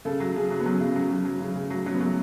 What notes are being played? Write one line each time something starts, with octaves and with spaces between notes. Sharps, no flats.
C#3 A4
F#3
C#3 G#4
F#3
B3
F#3 C#4
C#3
F#3
F#3
F#3
C#3
C#3
F#3
F#3 C#4
B3
F#3 A3